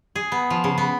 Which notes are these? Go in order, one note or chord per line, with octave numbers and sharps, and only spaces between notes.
G#4
B3
F3
C#3
B3